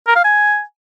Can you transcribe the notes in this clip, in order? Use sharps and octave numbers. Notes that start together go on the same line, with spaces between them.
A#4
F5
G#5